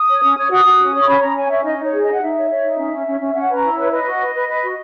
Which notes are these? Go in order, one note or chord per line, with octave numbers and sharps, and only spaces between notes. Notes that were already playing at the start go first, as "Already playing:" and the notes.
Already playing: D#6
C#5
C#4
C#5
F#4 D#6
F#4
C#4
C#5
C#6
C#4 B5
C#4 A#5
C#5 G#5
C#4 E5
D#4 D#5
D#4 C#5
G#4
D#4 D#5
F#5
D#4 E5
C#5
C#5
D#4
C#4
C#4
C#4
C#4
C#4 F#5
B4 A#5
E4
C#5
B4
B4 D#5
F#4
B4
B4
B4
F#4